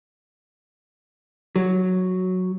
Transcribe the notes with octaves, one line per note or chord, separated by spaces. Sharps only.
F#3